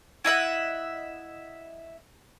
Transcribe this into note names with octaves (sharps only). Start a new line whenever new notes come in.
E4 D#5 E5 F#5